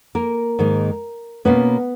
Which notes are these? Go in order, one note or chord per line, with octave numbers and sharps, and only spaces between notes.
A#3 A#4
G#2 D#3 A#3
B2 A#3 B3 C#4 B4